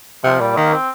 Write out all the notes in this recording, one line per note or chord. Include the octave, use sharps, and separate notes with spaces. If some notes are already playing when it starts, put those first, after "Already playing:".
C3 F3
A#2 G3
D#3 A#3
C4